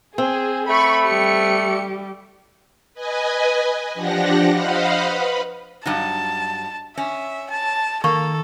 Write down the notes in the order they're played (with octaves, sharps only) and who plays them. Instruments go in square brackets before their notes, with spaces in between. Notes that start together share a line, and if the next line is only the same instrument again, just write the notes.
[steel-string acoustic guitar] C4 [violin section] G#4
[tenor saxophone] A3 [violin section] B5 C#6
[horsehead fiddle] G3 G4 [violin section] C#7
[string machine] B4 D#5 G#5
F3 D4 G4 F#5 A#6
C5 D#5 F5 F#5 B5
B4
[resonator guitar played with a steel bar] G2 F#3 D#4 [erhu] A5
[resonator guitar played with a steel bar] C#4 [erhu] E5
[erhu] A5
[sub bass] D#3 [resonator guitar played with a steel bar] A#3 [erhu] A4 [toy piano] C#6